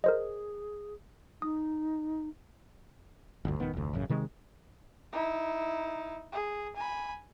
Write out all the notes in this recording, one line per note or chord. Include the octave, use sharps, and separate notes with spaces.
G#4 A#4 C5 D#5
D#4 D#6
G1 D2
D#1 D#3 B3
F1 D2
A1 F#2 C#3
C3 D#3 G#3 C4
D#4 E4
G#4
G#5 B5